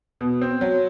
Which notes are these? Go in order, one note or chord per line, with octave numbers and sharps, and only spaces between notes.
B2
C4
F#3